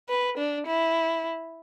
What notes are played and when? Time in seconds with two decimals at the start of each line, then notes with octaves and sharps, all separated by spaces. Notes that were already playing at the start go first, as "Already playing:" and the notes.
0.09 B4
0.38 D4
0.67 E4